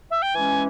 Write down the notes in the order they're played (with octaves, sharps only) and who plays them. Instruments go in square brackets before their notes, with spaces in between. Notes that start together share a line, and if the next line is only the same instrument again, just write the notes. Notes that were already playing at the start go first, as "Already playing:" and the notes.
[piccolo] E5
G5
[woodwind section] E3 G#3 C#4 [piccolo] G#5